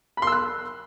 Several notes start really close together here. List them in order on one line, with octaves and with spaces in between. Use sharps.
B5 C6 E6 F#6